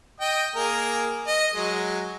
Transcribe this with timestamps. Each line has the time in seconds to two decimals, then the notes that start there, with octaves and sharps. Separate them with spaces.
0.20 D#5 G5 D#6
0.56 A#3 G#4 A#4
1.28 D#5
1.54 F#3 G#3